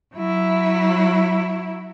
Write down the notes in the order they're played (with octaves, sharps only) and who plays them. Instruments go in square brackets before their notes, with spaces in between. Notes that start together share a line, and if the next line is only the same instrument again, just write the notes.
[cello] F#3 E4